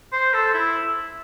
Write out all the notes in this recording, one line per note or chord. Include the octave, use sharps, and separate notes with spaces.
C5
A4
E4